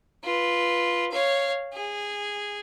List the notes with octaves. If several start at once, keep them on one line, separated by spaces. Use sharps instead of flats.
F4 B4
C#5 F5
G#4